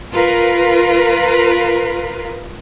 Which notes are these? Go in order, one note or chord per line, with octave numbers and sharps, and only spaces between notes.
F4 A#4 B4